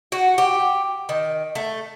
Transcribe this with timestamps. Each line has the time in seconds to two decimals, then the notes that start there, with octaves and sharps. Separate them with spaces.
0.12 F#4
0.38 G4
1.09 D#3
1.55 A3